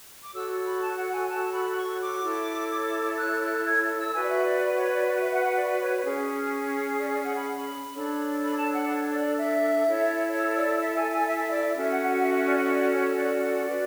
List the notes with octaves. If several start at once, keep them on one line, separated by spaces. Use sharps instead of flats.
D6
F#4 A4 C#5 E6
B5
A5
F#5
G#5
A5
B5
C#6
D6
E4 A4 C#5
F#6
F#6
G#6
E6
F#4 B4 G#5
D5
E5
D5
D5
C#5
D5
D5
E5
F#5
F#5
D5
C#5
C#4 G#4 C#5
D5
D5
F#5
B5
D4 A4 C#5
B5
A5
F#5
C#5
D5
E5
E4 A4 C#5
C#5
D5
E5
G#5
G#5
E5
D5
C#4 F#4 A4 E5
F#5
F#5
E5
E5
D5
C#5
D5
C#5
D5
F#4 B4